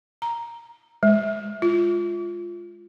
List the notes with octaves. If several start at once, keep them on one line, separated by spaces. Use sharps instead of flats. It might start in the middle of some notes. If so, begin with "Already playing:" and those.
A#5
G#3
F4